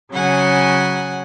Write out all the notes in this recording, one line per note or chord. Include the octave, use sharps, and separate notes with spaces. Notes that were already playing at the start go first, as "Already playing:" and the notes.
C#3 F#3 F#5 G#5